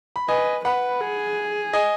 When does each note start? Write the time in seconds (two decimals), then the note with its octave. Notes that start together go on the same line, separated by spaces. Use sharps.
0.16 B5
0.28 B4 D#5 G#5
0.64 B4 F#5 B5
1.01 G#4
1.73 D#5 G#5